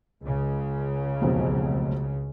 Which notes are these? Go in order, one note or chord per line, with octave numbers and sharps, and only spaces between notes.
C#2 C#3
F1 B1 F3